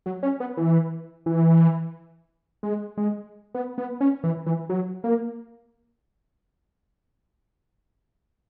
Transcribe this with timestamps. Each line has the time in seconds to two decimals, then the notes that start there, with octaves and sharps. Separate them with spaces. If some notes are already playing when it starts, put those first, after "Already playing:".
0.06 F#3
0.23 C#4
0.40 B3
0.57 E3
1.26 E3
2.63 G#3
2.97 G#3
3.55 B3
3.78 B3
4.01 C#4
4.24 E3
4.46 E3
4.69 F#3
5.04 A#3